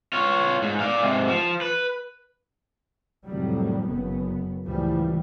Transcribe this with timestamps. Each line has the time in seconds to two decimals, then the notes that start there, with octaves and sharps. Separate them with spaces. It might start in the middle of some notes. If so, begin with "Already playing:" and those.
0.13 F4 C#5
0.62 G#2
0.80 D5 F5
1.01 G#2 C3
1.28 F3
1.61 B4
3.26 F2 A2 C3 D#3 F#3 G3
3.89 F#1 F#2 F#3 B3
4.66 C#2 A2 E3 F3 G3